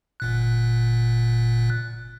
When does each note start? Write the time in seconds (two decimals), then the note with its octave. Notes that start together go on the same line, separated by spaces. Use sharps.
0.20 G1 A#2 F#6